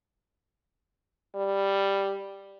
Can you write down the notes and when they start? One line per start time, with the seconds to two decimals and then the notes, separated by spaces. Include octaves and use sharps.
1.35 G3